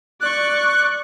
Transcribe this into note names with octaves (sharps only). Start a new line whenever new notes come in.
D5 C#6 F#6